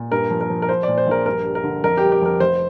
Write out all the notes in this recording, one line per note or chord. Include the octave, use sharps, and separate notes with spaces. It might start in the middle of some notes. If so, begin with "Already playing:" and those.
Already playing: A#2
G2 A#4
F3
A#4
F3
A#4
F4 C5
A#2 D5
C5
A#1 A#4
G2 A#4
G3
A#4
D3
F2 A#4
G4
G3
G4
F2 A#4
F1 C5